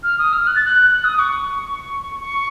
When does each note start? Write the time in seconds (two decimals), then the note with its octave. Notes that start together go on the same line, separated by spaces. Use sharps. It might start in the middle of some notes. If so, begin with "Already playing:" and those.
0.03 F6
0.18 D#6
0.33 F6
0.47 F#6
0.55 A6
0.65 F#6
0.90 F#6
1.04 D#6
1.19 C#6
2.21 C#6